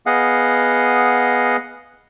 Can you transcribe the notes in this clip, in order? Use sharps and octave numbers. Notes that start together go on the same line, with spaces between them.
B3 G#4 D#5 F5 F#5